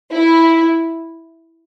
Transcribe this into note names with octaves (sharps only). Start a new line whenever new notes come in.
E4